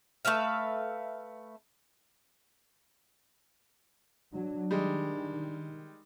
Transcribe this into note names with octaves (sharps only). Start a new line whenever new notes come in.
A3 B4 E5 F5
F#3 D4
D#3 G3 G#3